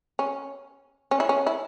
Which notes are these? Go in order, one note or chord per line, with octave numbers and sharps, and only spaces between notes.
C#4
C#4
E4
C#4
E4